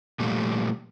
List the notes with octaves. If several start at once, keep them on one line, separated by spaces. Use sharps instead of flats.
A#2 F3 G3 A3